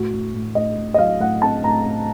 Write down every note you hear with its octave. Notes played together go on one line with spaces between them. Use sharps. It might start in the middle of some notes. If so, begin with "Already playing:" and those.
Already playing: A2 F#4
A2
A2
A2 D#5
A2
D#5
F#3 F5
A2 F#5
C4 A5
A2 A#5
A2